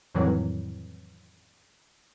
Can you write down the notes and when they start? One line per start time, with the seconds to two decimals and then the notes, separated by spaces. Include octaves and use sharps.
0.15 F2 A2 D#3 E3 F#3 G3